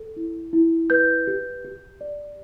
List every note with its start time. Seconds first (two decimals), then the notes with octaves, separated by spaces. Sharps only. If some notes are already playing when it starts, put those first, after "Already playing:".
Already playing: A4
0.16 E4
0.53 E4
0.90 B4 G6
1.27 G4
1.65 G4
2.01 D5